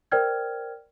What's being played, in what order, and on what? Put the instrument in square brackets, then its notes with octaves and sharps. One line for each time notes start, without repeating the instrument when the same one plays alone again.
[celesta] A#4 C5 D5 G5 F6 G#6